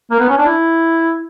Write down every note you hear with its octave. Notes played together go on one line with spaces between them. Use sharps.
A#3
B3
C#4
D4
E4